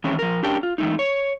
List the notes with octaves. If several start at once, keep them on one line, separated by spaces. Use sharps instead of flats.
D#3 E3 G#3 A3 C4 C#4
F3 A#4
C#4 D4 G4 A#4 G5 A5
F4
E3 G#3 A3 D#4
C#5